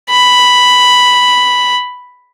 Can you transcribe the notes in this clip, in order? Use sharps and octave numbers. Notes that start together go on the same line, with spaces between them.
B5